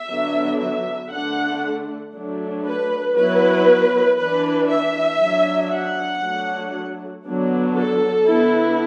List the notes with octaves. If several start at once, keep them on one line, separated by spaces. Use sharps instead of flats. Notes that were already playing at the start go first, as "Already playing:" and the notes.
Already playing: E5
D3 F#3 B3 D4
E5
D3 A3 D4 F#5
F#3 A3 D4
B4
F#3 B3 E4 B4
E3 D4 B4
E5
F#3 D4
F#5
F#3 A3 D4
D3 F#3 B3 D4
A4
D3 B3 E4